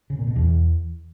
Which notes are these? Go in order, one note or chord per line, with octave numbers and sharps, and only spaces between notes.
C#3
A#2
B2
E2